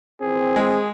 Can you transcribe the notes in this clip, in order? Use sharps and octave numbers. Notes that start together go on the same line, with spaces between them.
A#2 E3 C4 G#4
G#3